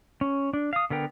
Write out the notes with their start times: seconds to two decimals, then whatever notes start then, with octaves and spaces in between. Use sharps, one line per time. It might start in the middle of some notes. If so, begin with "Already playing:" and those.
0.21 C#4
0.53 D4
0.73 F5 D#6
0.90 D3 B3 A#4 G5